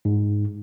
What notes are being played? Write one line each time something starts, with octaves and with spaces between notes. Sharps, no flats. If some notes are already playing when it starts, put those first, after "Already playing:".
G#2